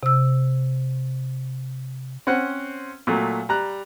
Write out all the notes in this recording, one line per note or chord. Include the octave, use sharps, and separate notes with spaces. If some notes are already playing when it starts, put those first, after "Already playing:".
C3 E6
C4 C#4 C5 F#5
A#2 F#3 A3
G3 A#5 F#6